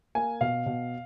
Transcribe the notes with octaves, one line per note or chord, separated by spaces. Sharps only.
A#3 G#5
B2 F5
B2